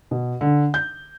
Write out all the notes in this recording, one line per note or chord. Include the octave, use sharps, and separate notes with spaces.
B2
D3
G6